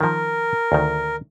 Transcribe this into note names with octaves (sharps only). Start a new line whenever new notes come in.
D#3 F3 A#4
D2 D#3